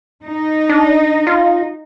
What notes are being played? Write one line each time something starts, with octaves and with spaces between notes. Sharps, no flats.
D#4
D4
F4